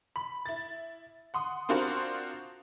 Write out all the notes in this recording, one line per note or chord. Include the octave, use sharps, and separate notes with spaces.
B5
E4 A6
F#5 C6 D#6
C4 D4 F4 F#4 A#4 C5